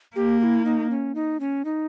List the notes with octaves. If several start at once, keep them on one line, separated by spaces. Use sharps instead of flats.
A#3 G4
G4
E4
D#4
C#4
D#4
C#4
D#4